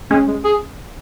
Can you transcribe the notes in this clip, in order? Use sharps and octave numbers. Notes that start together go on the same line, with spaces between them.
G#3 C#4
G#3
G#4